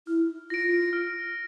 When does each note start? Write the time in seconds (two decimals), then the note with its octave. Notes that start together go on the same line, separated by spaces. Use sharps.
0.07 E4 F6
0.50 F4 A#6 D7
0.93 F6